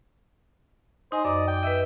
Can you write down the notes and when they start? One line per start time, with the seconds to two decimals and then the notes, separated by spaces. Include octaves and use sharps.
1.12 D#4 C5 D#5 G#5
1.25 F#2 D5 D6
1.48 G5
1.63 B4 D#5 E5